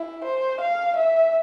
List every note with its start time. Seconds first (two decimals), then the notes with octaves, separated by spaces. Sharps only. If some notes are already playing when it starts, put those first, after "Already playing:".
Already playing: E4
0.24 C5
0.61 F5
0.96 E5